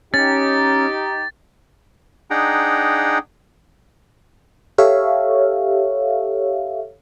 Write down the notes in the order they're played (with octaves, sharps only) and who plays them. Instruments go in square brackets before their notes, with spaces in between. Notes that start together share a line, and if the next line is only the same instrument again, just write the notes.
[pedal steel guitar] C#4 [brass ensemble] D#4 G4 [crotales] A6
[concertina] D4 D#4 G#4 F#5 G5 A#5
[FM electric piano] G4 A4 C#5 E5 F5